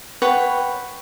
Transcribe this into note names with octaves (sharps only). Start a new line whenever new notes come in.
B4 C#5 F#5 G5